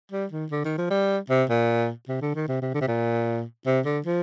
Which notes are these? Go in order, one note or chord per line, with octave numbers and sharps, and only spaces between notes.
G3
D#3
D3
D#3
F3
G3
C3
A#2
C3
D3
D#3
C3
C3
D3
C3
A#2
C3
D3
F3